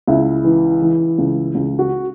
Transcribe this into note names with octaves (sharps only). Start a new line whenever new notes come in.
C#2 E4
E3
E3
C#2
C#2
F#4